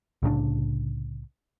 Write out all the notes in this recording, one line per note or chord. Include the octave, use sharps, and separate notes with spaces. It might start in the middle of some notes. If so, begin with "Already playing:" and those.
C2 A2 C#3 D4